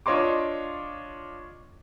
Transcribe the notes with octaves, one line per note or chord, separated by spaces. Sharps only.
D4 F4 C#5 D#5 C6 D6